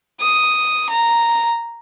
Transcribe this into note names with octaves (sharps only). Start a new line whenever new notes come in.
D#6
A#5